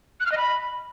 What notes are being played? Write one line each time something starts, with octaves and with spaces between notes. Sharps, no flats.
F#6
F6
D#5
B5